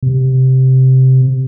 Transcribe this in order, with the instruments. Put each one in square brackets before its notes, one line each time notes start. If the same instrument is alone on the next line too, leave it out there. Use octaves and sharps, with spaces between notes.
[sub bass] C3